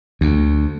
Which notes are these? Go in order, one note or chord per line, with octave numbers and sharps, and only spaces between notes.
D2